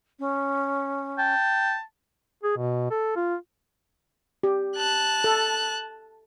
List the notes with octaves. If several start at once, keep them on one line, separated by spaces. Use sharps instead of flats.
C#4
G5 A5
G#4
B2
A4
F4
G4
A5 F#6
A4